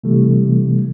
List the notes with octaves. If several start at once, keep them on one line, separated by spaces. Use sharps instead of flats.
C3 E3 G3 A3